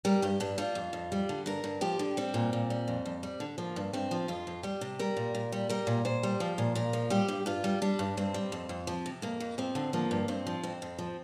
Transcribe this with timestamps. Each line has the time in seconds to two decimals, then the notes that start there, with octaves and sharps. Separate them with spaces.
0.05 G3 A#4
0.22 G2 G4
0.40 G2 D4
0.58 G3 F4
0.75 F2
0.93 F2
1.12 G3
1.29 D3
1.46 G2 A#4
1.64 G2
1.81 F3 G4
1.99 D3
2.17 G3 C4
2.34 A#2
2.53 A#2
2.70 G3
2.88 F2
3.05 F2
3.23 G3
3.40 D3
3.58 F3 A#3
3.76 G2
3.93 G2 C4
4.11 F3
4.28 F2 F4
4.47 F2
4.63 G3 G4
4.81 C3
4.99 G3 A#4
5.17 A#2
5.35 A#2
5.52 G3
5.69 G3 A#4
5.87 A#2
6.05 A#2 C5
6.23 G3
6.40 F3 C5
6.58 A#2
6.75 A#2 A#4
6.93 F3
7.10 G3 G4
7.28 G2
7.46 G2 F4
7.64 G3
7.82 G3 D4
7.99 G2
8.17 G2 C4
8.34 G3
8.52 F2
8.69 F2
8.87 F3
9.06 C3
9.22 F2 A#3
9.40 F2
9.58 F3 C4
9.75 D3
9.93 F3 A#3
10.11 G2
10.28 G2 C4
10.47 F3
10.63 F2 C4
10.82 F2
10.99 F3